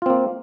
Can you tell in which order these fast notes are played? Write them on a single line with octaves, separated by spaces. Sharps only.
F4 C4 A#3